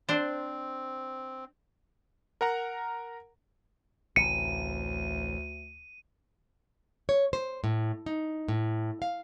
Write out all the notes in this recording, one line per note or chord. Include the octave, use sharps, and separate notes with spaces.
C4 D4 C5
A#4 F#5 A#5
A1 D2 C3 C#7 D#7
C#5
C5
A2
D#4
A2
F5